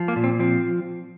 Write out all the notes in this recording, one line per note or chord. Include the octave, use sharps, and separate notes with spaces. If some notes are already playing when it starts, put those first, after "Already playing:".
Already playing: F3
A#3
A#2
C4
F3 C4